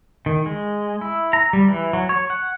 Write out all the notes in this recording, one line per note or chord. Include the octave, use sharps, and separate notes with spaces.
D#3
G#3
E4
A#5
G3
E3
F#3
C#5
F#5